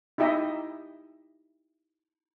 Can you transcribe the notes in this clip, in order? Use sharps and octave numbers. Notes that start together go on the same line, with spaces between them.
D#4 E4 G4 D#5 E5